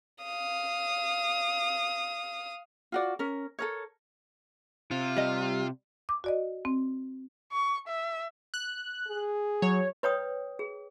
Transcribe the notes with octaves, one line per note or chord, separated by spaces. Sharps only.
F5 D#6
F4 F#4 D5
C#4 A#4
A4 A#4 C#5
C3 F4
G3 D#5
D6
F#4 D5 D#5
C4
C#6
E5
F#6
G#4
F#3 C#5
B4 C#5 G5 D#6
G#4